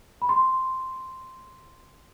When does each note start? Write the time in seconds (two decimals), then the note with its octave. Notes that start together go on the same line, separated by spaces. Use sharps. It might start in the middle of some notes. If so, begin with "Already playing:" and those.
0.22 B5
0.29 C6